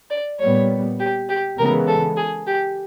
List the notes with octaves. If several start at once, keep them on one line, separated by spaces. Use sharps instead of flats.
D5
A#2 G3 B3 C#5
G4
G4
C#3 E3 G#3 B3 A#4
A4
G#4
G4